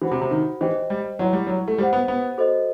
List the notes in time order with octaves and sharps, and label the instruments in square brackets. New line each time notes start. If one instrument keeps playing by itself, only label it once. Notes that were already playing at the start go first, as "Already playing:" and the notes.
[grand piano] E3 [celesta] F#4 C5 F#5 B5
[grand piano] C3
C3
D#3
[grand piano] E3 [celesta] G4 C5 D#5 G5
[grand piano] G3
[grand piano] F#3 [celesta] E4 B4 F#5 C6
[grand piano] G3
F#3
A3
[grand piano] G3 [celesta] G4 C5 F#5
[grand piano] B3
B3
[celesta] F#4 A4 C5 D#5